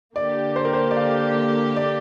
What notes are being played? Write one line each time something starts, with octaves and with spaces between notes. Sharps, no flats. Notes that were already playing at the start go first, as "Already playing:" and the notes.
D3 A#3 G4 D5
C5
A#4
C5
D5
F5
D5